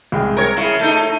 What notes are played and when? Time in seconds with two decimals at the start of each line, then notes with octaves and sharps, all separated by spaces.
0.12 C2 G#3 G5
0.37 A#4 C#5
0.57 C#3 E4
0.79 A3 D#4
0.97 E4